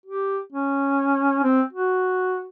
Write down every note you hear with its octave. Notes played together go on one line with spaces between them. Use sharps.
G4
C#4
C4
F#4